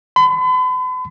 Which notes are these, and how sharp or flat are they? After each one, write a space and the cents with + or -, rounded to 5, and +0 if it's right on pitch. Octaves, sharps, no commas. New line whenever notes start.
B5 +40